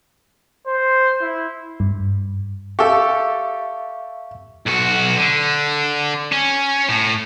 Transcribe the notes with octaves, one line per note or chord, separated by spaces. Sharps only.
C5
E4
G2
G4 A4 E5 F5 C#6
B1 F#4
D3
C#4
A2